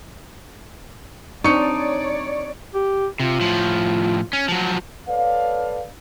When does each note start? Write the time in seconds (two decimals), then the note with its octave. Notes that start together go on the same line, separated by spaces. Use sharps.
1.44 C4 D4 D#4 C#5 D5 C#6 C#7
2.75 G4
3.20 C3 F4
3.40 A2 F3
4.33 C#4
4.48 F3 F#3
5.08 A4 B4 C#5 D5 F5